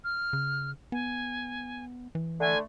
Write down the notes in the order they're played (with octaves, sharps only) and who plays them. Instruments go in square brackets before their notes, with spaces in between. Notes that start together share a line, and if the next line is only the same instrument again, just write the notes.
[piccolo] F6
[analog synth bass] C#3
[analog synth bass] B3 [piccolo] G#5
[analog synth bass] E3
[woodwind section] D3 A3 [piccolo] G#5